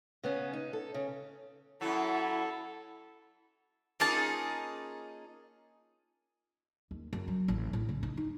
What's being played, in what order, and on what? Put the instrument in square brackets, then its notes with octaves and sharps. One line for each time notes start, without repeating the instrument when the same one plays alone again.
[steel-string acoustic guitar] C#3 B3 C#4
D#4
A4
C#3
[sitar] F#2 F#3 [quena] E4 [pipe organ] A4
[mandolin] A#3 F4 A5 [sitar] C#4 D#4 G#4
[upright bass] D#2
F#2
F#3
A1
A2
C#3
D#4
D#4